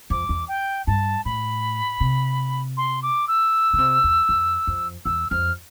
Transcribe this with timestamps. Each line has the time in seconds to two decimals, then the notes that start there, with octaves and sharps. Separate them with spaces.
0.10 F2 D6
0.29 E2
0.48 G5
0.87 G2 A5
1.25 A2 B5
2.01 C3
2.77 C6
3.03 D6
3.28 E6
3.73 D3
3.78 C3
4.04 E2
4.29 F2
4.67 F2
5.05 E2 E6
5.30 F2 F6